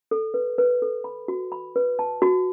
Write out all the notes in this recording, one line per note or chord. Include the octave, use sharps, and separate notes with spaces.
A4
B4
B4
A4
B5
F#4
B5
B4
A5
F#4